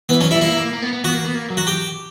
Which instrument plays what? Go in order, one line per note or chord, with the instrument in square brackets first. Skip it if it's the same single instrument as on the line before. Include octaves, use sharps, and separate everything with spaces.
[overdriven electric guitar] E3 [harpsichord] B3
[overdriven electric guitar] F#3 [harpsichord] C#4
[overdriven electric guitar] G3 [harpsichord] E4
[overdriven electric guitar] A#3 [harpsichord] E4
[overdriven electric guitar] A#3
A#3
B3
B3
[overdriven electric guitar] B3 [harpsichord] F#4
[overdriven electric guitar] A#3
B3
A#3
F#3
[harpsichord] F#4
G4